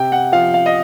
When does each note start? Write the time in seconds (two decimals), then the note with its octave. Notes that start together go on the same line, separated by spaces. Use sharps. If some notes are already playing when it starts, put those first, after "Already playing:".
Already playing: C3 G5
0.12 F#5
0.32 F3 F5
0.54 F5
0.66 D#5